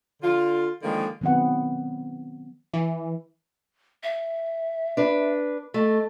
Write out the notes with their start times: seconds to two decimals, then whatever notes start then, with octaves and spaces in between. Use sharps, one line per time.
0.23 D3 F4
0.82 D3 D#3 F3 G#3 A#3
1.21 D#3 F#3 B3 C4 F#5
2.73 E3
4.03 E5
4.97 D4 B4
5.74 A3 D#5